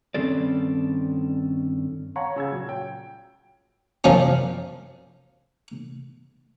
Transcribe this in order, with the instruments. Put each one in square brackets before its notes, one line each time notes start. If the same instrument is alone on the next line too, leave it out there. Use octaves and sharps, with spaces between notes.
[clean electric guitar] G2 D#3 C4 C#4 A4 D5
[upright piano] C#5 F5 F#5 A5 A#5 C#6
C#3 E6 G#6
A#2 F#3
G5
[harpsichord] F#2 F3 C#4